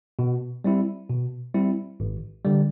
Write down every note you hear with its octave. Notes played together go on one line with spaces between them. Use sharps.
B2
G3 C4 E4
B2
G3 C4 E4
G#1
D3 G3